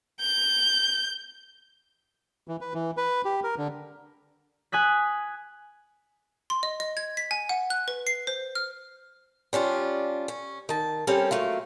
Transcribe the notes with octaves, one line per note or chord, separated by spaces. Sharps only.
G6
E3
B4
E3
B4
G4
A#4
D3
G#5 D#6 F#6 B6
C6
D#5
D#5
G#6
B6
G#5
F#5
F#6
B4
C7
C5
F6
G3 C#4 D4 F4
C#4
D#3 A5
G3 C4 C#4 A4 A#4
F#3 A3 A#3 F4